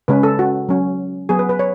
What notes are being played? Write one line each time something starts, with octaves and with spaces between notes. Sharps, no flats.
C#3 G#3 C#4 B4
A4
F#4
F#3 C#4
F#3 B3 G#4
B4
B4
C#5